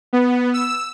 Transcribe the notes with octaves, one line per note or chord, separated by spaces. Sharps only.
B3
E6